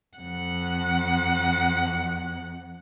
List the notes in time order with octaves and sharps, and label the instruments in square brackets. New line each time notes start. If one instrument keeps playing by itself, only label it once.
[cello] F2 F#5